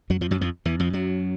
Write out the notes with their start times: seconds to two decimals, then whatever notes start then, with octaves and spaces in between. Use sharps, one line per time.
0.10 F#2 F#3
0.21 F2 F3
0.31 F#2 F#3
0.41 F2 F3
0.65 E2 E3
0.80 F2 F3
0.93 F#2 F#3